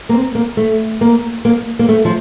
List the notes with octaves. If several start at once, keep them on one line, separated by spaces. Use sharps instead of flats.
A#3
C4
A#3
A3
A#3
A#3
A#3
A3
F3